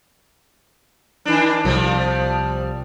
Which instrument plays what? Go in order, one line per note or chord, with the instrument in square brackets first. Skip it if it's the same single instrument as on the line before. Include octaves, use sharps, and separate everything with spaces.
[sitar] D#3 D4
[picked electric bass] C2 [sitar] F3 G3